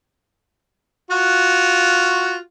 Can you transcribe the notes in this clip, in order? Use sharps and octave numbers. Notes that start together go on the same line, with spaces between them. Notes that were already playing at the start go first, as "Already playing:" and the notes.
F4 F#4